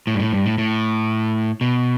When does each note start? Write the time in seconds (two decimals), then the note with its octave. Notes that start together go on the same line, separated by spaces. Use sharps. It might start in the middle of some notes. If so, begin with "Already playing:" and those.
0.07 A2
0.14 G2
0.20 A2
0.33 G2
0.46 A2
0.58 A2
1.61 B2